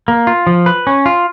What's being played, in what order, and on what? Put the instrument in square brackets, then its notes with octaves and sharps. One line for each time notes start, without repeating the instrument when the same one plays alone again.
[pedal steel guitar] A#3
F4
F3
B4
C#4
F4